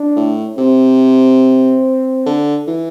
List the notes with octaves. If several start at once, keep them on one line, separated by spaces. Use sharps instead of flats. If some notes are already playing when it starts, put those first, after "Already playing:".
Already playing: D4
A2
C3 C4
D3
E3